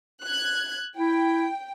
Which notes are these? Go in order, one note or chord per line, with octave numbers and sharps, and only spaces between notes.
F#6 G#6
E4 G5